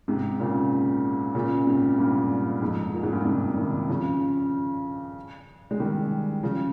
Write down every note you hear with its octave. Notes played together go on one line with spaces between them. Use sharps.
G#2 C3
A#2 C#3
A#2 C#3
G#2 C3
G2 A#2
F2 G#2
A#2
G#2
G2 A#2
G#2 C3
C3 D#3
C#3 F3
G#3
D#3 G3
C#3 F3